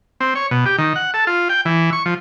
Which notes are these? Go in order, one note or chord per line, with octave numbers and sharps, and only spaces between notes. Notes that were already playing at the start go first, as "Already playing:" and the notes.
C4
C#5
B2
G4
D#3
F#5
A4
F4
G5
E3
C#6
F3